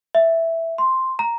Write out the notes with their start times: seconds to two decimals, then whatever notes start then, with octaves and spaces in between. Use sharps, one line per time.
0.15 E5
0.78 C6
1.19 A#5